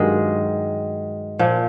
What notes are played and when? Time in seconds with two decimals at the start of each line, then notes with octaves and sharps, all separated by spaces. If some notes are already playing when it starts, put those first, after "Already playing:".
Already playing: G2 D#3 F#3 G#3
1.39 A#2 F3